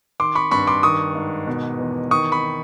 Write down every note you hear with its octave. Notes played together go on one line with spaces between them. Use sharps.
D#3 C6 D6
B5 C#6
G2 B5 C#6
C6 D6
D#3 C#6 D#6
G#2
B2
E2
D#3 C#6 D#6
B5 C#6